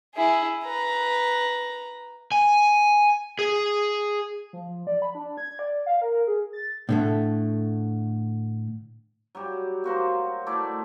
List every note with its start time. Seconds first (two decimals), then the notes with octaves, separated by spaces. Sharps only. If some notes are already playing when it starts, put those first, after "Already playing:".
0.15 E4 G#4
0.63 B4 A#5
2.32 G#5
3.39 G#4
4.53 F3
4.87 D5
5.02 B5
5.15 D4
5.37 G#6
5.59 D5
5.86 F5
6.01 A#4
6.27 G#4
6.53 A6
6.89 A2 D3 A3
9.35 F#3 G3 G4
9.84 A#3 F#4 C5
10.46 A3 E4 D5 D6